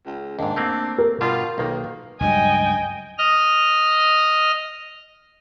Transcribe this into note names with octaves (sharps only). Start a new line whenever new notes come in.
C#2
D#2 G#2 D4
A3 A#3 C4
A#4
G2 B2 G3 F4
B1 D#3 A#3
C#2 G2 F#3 D#5 G5 G#5
D#5 F6